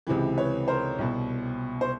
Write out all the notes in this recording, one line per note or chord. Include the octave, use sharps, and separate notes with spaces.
C#2 C3 E3
B4 C#5
A#4 C5
C2 B2
C5